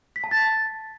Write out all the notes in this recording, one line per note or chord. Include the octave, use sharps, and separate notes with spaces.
B6
A5
A6